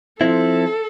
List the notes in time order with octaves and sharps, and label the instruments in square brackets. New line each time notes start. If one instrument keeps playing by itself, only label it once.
[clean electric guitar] F3 C4 E4 [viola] A4